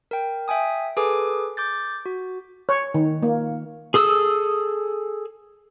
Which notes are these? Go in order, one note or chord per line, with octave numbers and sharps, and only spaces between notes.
A#4 G5
E5 G5 G#5 D#6
G#4 A4 B4 G#5 D6
D6 G6 A6
F#4
C#5
D#3
A#3
G#4 A4 D#6 E6